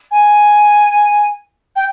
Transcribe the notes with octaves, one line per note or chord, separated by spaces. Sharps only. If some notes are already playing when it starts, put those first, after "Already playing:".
G#5
G5